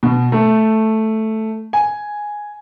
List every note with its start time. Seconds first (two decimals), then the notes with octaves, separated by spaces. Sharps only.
0.03 B2
0.32 A3
1.73 G#5